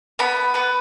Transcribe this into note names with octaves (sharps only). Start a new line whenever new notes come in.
B3 B5
B3 B4